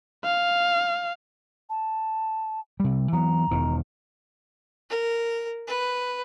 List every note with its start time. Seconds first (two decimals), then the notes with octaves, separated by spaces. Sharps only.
0.24 F5
1.70 A5
2.80 C3 G3
3.13 E3 F#3 B3 A#5
3.51 E1 E2 D#3
4.90 A#4
5.67 B4